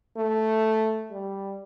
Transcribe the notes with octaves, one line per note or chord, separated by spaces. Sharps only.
A3
G3